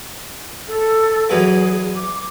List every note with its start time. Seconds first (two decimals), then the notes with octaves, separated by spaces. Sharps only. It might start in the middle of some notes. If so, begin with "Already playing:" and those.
0.68 A4
1.30 E2 E3 F#3 G#4
1.96 D6